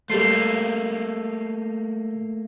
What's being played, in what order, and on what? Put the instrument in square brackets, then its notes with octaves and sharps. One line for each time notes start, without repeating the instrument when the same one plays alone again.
[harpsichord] G3 A4 C6 [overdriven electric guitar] A3 A#3